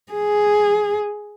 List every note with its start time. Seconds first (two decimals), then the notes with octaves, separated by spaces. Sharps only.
0.12 G#4